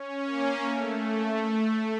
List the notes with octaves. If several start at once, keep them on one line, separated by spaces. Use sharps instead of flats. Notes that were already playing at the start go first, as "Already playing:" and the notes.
Already playing: C#4
A#3
A3